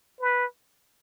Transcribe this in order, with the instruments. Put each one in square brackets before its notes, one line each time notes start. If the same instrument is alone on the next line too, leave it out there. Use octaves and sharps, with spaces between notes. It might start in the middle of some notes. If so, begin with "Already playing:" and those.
[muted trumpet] B4